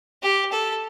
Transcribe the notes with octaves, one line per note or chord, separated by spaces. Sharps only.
G4
A4